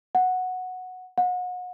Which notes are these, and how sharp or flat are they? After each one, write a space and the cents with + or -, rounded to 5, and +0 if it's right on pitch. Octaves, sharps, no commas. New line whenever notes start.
F#5 -5
F#5 -35